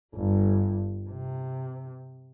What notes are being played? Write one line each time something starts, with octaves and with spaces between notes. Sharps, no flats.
G1 G2
C3